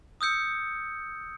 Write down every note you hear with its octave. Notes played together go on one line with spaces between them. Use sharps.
D#6 E6 G6 C#7